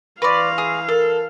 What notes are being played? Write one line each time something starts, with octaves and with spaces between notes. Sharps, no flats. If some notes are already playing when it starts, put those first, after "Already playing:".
E3 B4 D5 F5 C6 C#6 A#6
G#4
A4 A#4